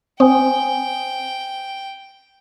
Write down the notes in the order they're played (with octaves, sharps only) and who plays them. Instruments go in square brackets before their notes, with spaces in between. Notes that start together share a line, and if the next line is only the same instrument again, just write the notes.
[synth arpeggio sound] C4 [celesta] C5 G#5 D#6 [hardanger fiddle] G5